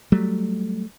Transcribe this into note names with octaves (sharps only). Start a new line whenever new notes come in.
F#3 G3 A3